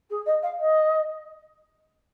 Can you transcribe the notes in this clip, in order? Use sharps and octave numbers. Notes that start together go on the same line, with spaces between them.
G#4
D#5
F5
D#5